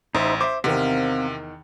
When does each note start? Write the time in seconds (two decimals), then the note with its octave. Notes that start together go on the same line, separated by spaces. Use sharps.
0.15 A1 D#4 C5 E5
0.41 C5 E5 D6
0.64 E2 C3 D#3 C4 A#4 F5